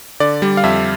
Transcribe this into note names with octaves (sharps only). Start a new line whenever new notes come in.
D3 D5
G3
F5
F2 E5